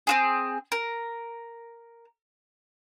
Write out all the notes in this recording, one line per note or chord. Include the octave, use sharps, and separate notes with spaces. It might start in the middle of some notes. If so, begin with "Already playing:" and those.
C4 F#4 G#4
A#4